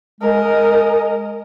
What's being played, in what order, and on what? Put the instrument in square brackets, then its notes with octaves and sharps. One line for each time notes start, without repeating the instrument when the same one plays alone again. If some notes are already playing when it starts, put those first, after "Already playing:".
[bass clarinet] G#3 [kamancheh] A#4 D#5